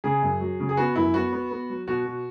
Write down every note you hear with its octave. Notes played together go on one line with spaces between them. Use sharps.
C#3 G#4
F#2
F#3
C#3
G#4
B3 F#4
F#2 E4
B3 F#4
B3
B3
F#3
B2 F#4
B2